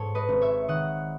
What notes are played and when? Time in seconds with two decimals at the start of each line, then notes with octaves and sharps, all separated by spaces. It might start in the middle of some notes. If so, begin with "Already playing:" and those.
Already playing: G#2 A4 C#5
0.15 B4 D#5
0.29 G#1
0.41 C#5 E5
0.68 D#3 D#5 F#5